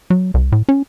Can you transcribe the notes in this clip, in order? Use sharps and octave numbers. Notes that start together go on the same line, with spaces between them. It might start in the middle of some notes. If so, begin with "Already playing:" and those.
F#3
C2
A2
C#4